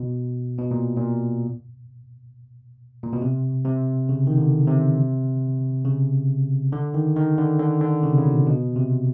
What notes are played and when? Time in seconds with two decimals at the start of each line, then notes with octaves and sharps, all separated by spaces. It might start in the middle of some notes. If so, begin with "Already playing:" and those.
Already playing: B2
0.58 B2
0.71 A#2
0.97 A#2
3.03 A#2
3.13 B2
3.21 C3
3.65 C3
4.09 C#3
4.27 D#3
4.38 D3
4.67 C3
5.85 C#3
6.72 D3
6.94 D#3
7.16 D#3
7.38 D3
7.60 D3
7.81 D3
8.03 C#3
8.10 C3
8.18 C#3
8.26 B2
8.47 B2
8.76 C3